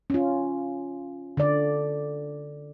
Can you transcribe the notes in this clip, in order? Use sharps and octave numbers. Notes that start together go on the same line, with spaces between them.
C#4 F4
D3 D5